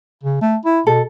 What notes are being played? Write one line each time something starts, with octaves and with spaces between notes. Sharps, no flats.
C#3
A3
E4
B2 A4